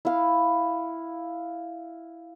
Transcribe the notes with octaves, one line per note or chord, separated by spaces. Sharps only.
E4 F5